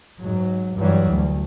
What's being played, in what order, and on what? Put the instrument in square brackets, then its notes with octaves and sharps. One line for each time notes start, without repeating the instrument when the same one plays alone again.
[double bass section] G#2 F#3
G2 E3 F#3 G3
D2